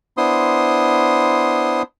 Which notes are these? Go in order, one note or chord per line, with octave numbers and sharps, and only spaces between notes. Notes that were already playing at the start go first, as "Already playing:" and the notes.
B3 D4 E4 C5 C6 D#6